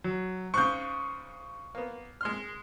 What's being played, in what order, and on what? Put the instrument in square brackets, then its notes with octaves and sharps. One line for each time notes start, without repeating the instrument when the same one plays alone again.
[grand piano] F#3
[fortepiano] G#2 C#3 [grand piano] C#6 F#6 G6
[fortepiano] A#3 B3
G#3 C6 F6